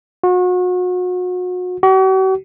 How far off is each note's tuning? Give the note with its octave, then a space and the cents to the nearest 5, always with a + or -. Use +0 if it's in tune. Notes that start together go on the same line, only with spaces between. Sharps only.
F#4 -35
F#4 +45